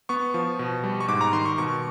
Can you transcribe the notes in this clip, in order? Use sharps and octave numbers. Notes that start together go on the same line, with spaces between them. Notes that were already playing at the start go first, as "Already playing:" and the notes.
B3 C#6
F3
B2
G3
C#6
G#2 D6
A#5
D#3 C6
C#6
B2 C#6